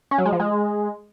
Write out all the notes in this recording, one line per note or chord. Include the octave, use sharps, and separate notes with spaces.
C#4
F#3
G#3
F3
G#3